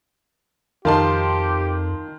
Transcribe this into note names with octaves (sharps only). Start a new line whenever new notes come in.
F2 D#3 D#4 F4 G4 A5 C6